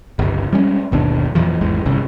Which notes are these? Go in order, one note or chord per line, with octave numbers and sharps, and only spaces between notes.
G1 C#2
G3 G#3 C#4
G1 D#2 B2 D4
F2 A#2 E3 F3
G#1 E2 G#3
G1 C2 C#3